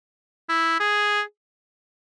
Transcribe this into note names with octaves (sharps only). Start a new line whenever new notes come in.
E4
G#4